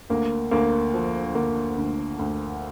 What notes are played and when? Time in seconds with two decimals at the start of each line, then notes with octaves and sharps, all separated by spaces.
0.10 D2 A#3
0.51 D2 A#3
0.94 F3
1.35 D3 A#3
1.78 D2
2.19 D2